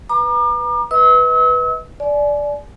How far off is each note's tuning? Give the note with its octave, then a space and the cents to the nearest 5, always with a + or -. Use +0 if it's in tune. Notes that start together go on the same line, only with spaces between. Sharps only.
B4 +0 A#5 +25 D6 +40
B4 +0 D#5 +40 E6 -40
D5 -5 G#5 +35